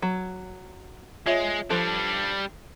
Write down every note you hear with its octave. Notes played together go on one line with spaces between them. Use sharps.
F#3
G#3 F4 C#5 E5
F3 G3 D4 A4